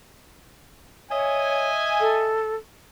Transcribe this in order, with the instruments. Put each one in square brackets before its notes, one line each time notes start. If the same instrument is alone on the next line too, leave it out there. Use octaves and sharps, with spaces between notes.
[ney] C#5 [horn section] D#5 E5 G#5
[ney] A4